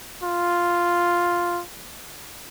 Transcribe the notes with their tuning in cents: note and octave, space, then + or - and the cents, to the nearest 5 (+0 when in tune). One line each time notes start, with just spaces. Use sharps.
F4 +0